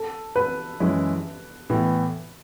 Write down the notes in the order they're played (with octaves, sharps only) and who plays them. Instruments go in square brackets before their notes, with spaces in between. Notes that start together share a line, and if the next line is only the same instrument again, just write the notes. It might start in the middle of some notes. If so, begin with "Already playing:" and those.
Already playing: [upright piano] A4
B4
[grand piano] F#2 E3 G#3 C#4 E4
A2 E3 B3